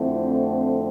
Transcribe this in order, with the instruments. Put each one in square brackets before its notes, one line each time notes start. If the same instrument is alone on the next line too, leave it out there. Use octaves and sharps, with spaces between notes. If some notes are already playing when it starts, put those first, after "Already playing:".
Already playing: [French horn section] F2 D3 A3 C4 E4